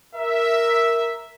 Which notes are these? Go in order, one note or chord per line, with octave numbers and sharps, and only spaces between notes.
A#4 E5